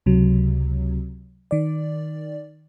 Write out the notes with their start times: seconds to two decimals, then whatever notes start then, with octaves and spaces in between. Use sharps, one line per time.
0.06 C#2 C3 F#3
1.51 D#3 D5